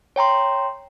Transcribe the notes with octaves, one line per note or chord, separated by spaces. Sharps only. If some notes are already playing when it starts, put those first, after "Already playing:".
C#5 G5 A#5 C6